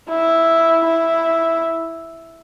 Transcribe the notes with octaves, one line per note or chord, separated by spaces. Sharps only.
E4
E4